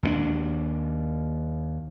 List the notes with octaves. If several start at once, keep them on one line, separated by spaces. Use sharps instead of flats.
D#2 G#3 D4